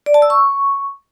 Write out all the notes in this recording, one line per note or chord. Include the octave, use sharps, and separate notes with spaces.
D5
A5
E6
C#6